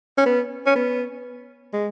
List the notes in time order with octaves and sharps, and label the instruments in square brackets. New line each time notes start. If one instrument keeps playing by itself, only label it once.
[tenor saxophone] C#4
B3
C#4
B3
G#3